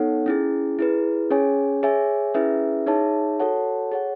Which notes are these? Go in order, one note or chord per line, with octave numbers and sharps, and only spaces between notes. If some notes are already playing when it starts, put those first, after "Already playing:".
Already playing: B3 D#4 A4 C#5 F#5
C#4 E4 G#4
E4 G#4 B4
C#4 G#4 C#5 G#5
G#4 C#5 E5 G#5
C#4 E4 G#4 B4 E5
D#4 G#4 C#5 E5 A5
F#4 A4 C#5 F#5 A5
G#4 C#5 F#5